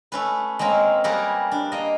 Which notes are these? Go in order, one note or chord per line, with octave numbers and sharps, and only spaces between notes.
A3 C#4 B4
G#3 A#3 C4 C#4 A#4
G3 A#3 G4 G#4 A#4 B4
D4
A#3 D#5